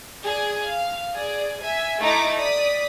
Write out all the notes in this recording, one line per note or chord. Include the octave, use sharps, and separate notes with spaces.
G#4 D5
F5
G#4 D5
E5 G#5
A3 D#4 E4 A#5 D6 A6
D5 D#6 B6